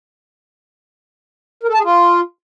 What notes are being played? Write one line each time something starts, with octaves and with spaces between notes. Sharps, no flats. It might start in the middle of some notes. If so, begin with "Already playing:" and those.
A#4
A4
A5
G#4
F4